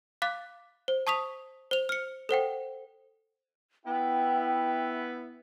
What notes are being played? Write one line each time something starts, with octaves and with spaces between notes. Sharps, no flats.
F5 D6 F#6 A6 B6
C5
A5 C#6 D#6 B6 F7
C5 F7
F6 C#7
A4 C5 F#5 G5
B3 E4 G5